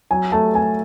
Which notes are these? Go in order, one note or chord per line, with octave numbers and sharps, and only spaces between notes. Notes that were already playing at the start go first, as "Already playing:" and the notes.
F#3 G#5
A3 A5
A3 G#5